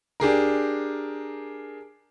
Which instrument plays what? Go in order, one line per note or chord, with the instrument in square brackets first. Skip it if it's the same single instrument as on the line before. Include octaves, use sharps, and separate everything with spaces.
[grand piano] D4 G4 G#4 A#4